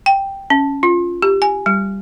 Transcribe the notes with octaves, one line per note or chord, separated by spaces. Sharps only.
G5
C#4
F4
G4
G#5
G3